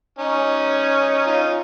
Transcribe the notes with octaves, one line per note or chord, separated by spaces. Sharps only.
C#4 D#4
D#4 F4